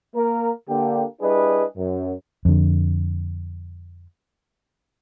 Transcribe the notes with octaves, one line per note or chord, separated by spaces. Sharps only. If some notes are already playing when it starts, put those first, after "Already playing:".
A#3 A#4
D3 A#3 G4
G3 D4 E4 G#4 B4 D#5
F#2
F2 D3